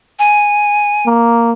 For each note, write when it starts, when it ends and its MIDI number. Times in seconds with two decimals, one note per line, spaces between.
0.19 1.06 80
1.06 1.53 58